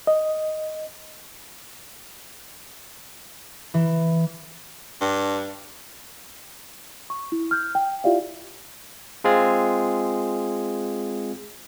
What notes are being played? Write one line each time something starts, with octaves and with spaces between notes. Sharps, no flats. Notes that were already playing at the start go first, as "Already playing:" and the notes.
D#5
E3
G2
C#6
E4
F6 G6
G5
E4 F4 G4 D5 E5 F5
G#3 C4 F4 G#4